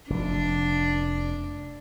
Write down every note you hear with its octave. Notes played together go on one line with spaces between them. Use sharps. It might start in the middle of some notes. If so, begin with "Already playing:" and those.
F1 D4